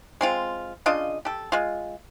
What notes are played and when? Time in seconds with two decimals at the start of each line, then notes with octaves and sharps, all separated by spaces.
0.21 G#3 C4 F4
0.86 C#3 D4 F4 D#5
1.25 G4 A4
1.52 G#3 F4